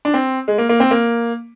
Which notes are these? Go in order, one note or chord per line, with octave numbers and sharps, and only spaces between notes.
D4
C4
G#3
A#3
A#3
C4
A#3